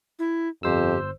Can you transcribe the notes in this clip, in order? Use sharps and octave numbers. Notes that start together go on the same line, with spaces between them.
E4
G1 F2 G4 C5 E6